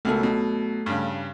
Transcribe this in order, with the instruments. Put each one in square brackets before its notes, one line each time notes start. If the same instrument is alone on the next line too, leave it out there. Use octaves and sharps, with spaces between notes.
[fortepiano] C#2 B2 A#3 [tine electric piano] A3 A4
[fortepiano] B2 F#3
G2 C#3